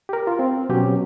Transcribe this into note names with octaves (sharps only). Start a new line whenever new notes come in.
G4 A#4
F4
C4
B2 F#3 C#4 G4